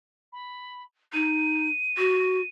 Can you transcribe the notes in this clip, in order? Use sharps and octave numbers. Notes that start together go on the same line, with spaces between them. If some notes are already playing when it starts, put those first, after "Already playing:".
B5
D#4 D#7
F#4